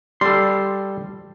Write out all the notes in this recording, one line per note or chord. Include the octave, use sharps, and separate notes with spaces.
G3 A4 C6